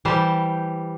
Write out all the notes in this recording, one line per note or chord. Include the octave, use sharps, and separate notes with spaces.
E3 G3 G4 C5 F5 A5